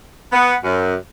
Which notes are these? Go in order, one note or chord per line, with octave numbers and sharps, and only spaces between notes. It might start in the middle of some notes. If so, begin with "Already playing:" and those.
B3
F#2